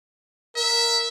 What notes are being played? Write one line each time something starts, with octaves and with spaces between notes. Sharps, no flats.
A#4 E5